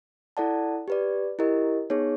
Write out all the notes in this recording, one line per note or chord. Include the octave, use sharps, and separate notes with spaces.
E4 A4 D5 F#5 A5
G4 B4 D5
E4 G4 A#4 D#5
B3 D#4 G#4 C#5